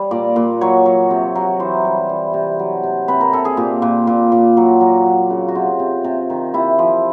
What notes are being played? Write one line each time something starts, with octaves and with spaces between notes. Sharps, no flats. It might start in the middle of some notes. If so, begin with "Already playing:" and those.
Already playing: G3 C#5
A#2 D5
A#2
F#3 C#5
F#3
C3
F#3
E3 C5
G3
E3
C3
F#3
C3
C3 B4
A#4
C3 A4
G#4
A#2 G4
A#2
A#2
A#2
F#3
F#3
F#3
C#3
F#4
C3 F4
C3
C3
D#3
C3 E4
F3